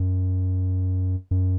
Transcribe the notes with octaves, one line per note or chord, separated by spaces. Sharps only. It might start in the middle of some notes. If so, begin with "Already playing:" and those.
Already playing: F#2
F#2